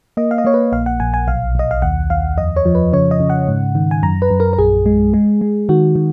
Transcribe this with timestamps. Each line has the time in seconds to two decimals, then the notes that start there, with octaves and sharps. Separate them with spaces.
0.17 A#3 D#5
0.31 F5
0.38 D#5
0.45 A#3 C#5
0.54 B4
0.72 A#1 F5
0.86 F#5
1.00 A#1 G#5
1.14 G#5
1.28 B1 F5
1.55 B1 D#5
1.71 F5
1.82 D#2 F#5
2.10 D#2 F5
2.38 F2 D#5
2.56 C#5
2.65 F3
2.75 B4
2.93 C#3 C#5
3.11 D#5
3.20 C#3
3.30 F#5
3.48 G#2
3.75 D#3
3.91 G#5
4.03 F#2 A#5
4.22 B4
4.30 F#2
4.40 A#4
4.53 A#4
4.58 A#1 G#4
4.86 G#3
5.14 G#3
5.41 G#3
5.69 D#3 F#4
5.95 D#3